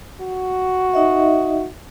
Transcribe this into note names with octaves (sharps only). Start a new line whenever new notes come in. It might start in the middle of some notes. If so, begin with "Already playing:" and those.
F#4
D#4 D#5 E5